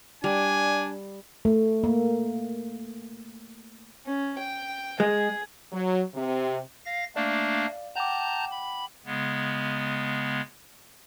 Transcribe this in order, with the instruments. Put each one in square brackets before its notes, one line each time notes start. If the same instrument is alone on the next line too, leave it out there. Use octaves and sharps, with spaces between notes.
[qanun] G3 [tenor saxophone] D4 [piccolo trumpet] G#5
[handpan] A3
A#3
[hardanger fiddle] C#4
G5
[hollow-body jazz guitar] G#3 [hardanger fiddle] G#4
[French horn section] F#3
C3
[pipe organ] F5 A#6
[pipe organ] A3 A#3 D4 [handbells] D5 F5
[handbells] F#5 G5 D6 [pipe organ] A5 A#5 G6
[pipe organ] B5
C#3 G#3 B3